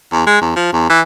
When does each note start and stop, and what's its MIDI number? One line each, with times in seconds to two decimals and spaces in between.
0.13 0.24 40
0.26 0.40 56
0.41 0.53 40
0.56 0.68 53
0.73 0.86 40
0.90 1.00 52